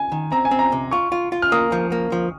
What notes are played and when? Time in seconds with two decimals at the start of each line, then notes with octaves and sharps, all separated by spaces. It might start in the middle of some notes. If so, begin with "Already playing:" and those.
Already playing: G#5
0.12 D#3
0.32 C4 A#5
0.45 G#5
0.51 C4
0.59 A#5
0.72 C3
0.91 F4 C#6
1.12 F4
1.32 F4
1.42 F6
1.52 A#3 D#6
1.72 F3
1.92 A#3
2.12 F3